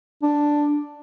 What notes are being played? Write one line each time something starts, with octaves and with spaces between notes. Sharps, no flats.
D4